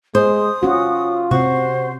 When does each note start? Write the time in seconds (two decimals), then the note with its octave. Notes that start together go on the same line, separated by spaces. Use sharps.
0.15 G#3 C5 D#6
0.63 C#4 F4 F#4
1.31 C3 F#4 C5